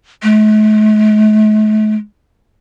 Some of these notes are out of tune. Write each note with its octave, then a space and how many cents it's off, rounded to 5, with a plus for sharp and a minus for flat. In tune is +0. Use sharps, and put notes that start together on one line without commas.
A3 -45